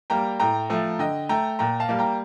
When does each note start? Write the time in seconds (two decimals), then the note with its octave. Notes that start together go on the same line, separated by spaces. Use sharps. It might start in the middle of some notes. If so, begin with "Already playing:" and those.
0.10 G3 A#3 G5 A#5
0.40 A2 G5 A#5
0.70 F3 A3
0.99 D3 D#5 G5
1.29 A3 G5 A#5
1.59 A#2 G5 A#5
1.80 F5 A5
1.89 G3 A#3
1.99 G5 A#5